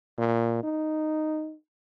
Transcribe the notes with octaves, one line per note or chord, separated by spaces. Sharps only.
A#2
D#4